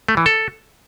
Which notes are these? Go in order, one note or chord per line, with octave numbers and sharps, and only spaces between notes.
A3
E3
A4